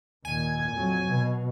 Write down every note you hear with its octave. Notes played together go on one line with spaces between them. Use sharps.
D#2 A#2 G#5
F2 F#3
B2